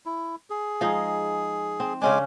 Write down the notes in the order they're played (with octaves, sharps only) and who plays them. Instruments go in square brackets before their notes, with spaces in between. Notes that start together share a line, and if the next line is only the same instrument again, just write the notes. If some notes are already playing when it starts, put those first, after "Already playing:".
[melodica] E4
G#4
[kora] F3 G#3 D#4
C4
[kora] C#3 C#4 D4 [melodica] G#3 G#5 D6